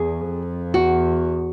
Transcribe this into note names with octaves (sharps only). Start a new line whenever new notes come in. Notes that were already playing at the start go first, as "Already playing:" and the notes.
Already playing: E2 G#4
F2
E2 F#4